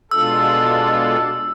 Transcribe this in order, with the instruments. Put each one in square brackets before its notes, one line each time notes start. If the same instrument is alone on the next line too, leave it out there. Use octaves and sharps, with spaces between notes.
[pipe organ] B2 G#3 D4 F4 A4 [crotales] E6